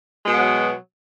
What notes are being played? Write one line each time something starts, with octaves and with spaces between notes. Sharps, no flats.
B2 F#3 G#3 B3